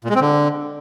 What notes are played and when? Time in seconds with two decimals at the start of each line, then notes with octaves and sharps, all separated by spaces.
0.04 A#2
0.10 G#3
0.15 C4
0.21 D3